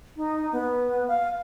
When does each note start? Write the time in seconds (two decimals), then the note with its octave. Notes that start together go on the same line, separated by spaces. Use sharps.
0.16 D#4
0.52 B3
1.08 F5